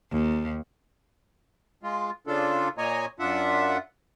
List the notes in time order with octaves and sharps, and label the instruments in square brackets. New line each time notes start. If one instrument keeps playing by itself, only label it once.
[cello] D#2
[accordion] G#3 F4
C#3 D4 F4 A4
A#2 A#3 C#5 D#5 G#5 A#5
F#2 D4 F4 E5 F#5